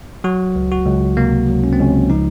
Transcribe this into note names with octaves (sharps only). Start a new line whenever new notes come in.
F#3 F#4
C#2
F#4
C#2
C3 A#3
F#3
C#4
C4
C#2 C#4
F3 D#4